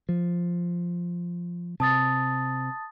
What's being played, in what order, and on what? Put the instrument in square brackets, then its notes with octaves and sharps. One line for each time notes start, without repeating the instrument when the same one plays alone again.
[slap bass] F3
[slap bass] C3 [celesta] A5 D#6 A6